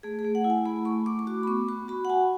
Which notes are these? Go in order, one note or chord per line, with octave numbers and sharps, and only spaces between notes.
A3 G#4
G#4
A3
F#5
E4
G#5
A3 B5
A3 C#6
A3 D6
C#6
F#4 D6
B5
B3 C#6
F#4 C#6
F#4 B5
F#5
F#4 G#5